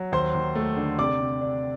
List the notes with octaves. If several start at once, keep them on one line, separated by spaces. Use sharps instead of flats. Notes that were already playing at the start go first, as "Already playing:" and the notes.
Already playing: F#3
D#2 C5 C6
D#2
A3
D3
C3 D5 D6
C3
D4